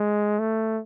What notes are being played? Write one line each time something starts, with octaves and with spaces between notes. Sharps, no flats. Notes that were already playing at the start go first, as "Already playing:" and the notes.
Already playing: G#3
A3